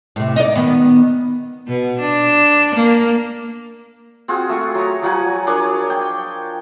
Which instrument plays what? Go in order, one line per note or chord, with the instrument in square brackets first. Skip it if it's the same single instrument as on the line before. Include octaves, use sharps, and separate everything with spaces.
[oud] A2 C3
D#4 D5
D#3 B3
[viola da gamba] B2
D4
A#3
[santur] C4 F4 F#4 G#4
A3 G#4 C#6
F#3 A#5
F3 F#3 F#5 G#5
D4 A#4 C#5 D#6
G5